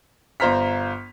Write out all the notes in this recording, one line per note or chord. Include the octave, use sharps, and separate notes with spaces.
G1 F4 C5 A#5 F6 B6